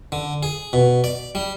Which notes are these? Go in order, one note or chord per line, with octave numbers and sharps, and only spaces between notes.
D3
G#4
B2
D5
G3